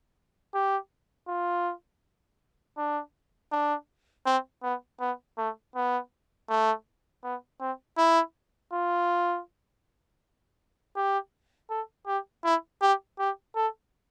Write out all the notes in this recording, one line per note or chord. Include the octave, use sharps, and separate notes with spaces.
G4
F4
D4
D4
C4
B3
B3
A3
B3
A3
B3
C4
E4
F4
G4
A4
G4
E4
G4
G4
A4